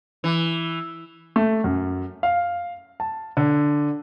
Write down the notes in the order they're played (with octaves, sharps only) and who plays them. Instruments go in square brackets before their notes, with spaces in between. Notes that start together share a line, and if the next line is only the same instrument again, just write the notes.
[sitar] E3
[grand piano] A3
F#2
F5
A5
D3